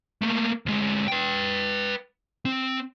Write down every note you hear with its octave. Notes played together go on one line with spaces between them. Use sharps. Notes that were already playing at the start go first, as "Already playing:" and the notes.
A3 A#3
D2 G#3
B4 G5
C4